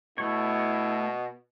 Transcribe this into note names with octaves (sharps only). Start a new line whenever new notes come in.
B2 A3 E4 C#5